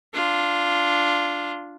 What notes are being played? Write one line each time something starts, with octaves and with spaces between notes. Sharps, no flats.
D4 F4